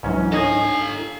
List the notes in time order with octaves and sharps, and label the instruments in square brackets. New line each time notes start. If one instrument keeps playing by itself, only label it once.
[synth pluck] C#2 E3 F#3 [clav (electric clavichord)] G#2 C#4 [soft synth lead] D4
[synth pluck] D#4 C#5 D#5 [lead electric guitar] A4 G#5
[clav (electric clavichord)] F5